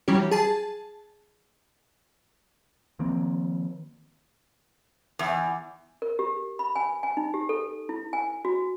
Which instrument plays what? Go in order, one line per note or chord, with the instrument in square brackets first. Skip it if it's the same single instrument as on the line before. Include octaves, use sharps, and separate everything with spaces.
[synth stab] E3 F#3 G3 C#4 G4
G#4 A5
[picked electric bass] D#3 F3 A#3 C4
[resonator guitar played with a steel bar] E2
[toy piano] A#4
G4
B5
G#5
G#5
D#4
G4
A4
E4
G#5
F#4